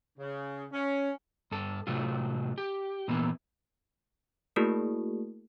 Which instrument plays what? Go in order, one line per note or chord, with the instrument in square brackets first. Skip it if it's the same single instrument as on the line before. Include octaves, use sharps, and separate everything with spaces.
[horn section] C#3
C#4
[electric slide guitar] G2 A4
A2 C3 F#3 F4
G4
A#2 E3 A#3 B3 E4
[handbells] A3 A#3 E4 F#4 G#4 A#4